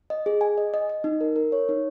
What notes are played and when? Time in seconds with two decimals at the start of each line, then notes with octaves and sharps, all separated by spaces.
0.10 D#5
0.26 G#4
0.41 G#5
0.58 D#5
0.74 D#5
0.89 D#5
1.04 D#4
1.21 A#4
1.36 A#4
1.52 C#5
1.69 D#4